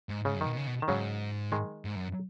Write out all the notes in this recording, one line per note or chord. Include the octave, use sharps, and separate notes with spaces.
G#2
G#2 C#3
F#2
B2 D#3
B2
C#3
B2
D#3
G#2 C#3 F#3
D#3 G#3
G#2
F#2